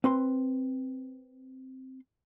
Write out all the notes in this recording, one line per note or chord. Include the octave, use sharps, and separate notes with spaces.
C4 B4 C6